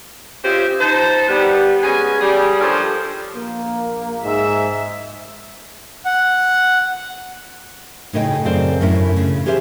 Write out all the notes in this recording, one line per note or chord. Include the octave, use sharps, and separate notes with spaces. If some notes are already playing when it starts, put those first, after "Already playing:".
C#4 F4 G4 C5 D#5 E5
D#4 C5 A5
G3 B3
G#3 B3 C#4 G#5
G3 G#4
F3 D4 A4 A#4 C5 C#5
A#1 A#3
G#2 E5
F#5
A2 C#3 D#4 D#5 E5 G5
F#2 C#3 C4 C5 D5
F#2 A2 C#4 D4 E4
C#3
C#4 G4 G#4 C5 D5 E5